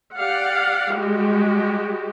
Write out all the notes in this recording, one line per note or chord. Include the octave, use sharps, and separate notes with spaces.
G4 D5 F5 F#5
G3 G#3 F#4 G4